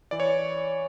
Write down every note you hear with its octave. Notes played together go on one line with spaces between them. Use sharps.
E3 D5
C#5